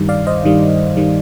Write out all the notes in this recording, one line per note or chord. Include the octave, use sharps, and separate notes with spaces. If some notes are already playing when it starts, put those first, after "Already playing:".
Already playing: G2 D#3 G3
D5 F5
C5 D#5
G2 D#3 G3
D#3 G3